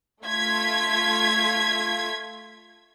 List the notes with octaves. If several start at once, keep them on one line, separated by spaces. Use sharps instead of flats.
A3 F4 G#6 B6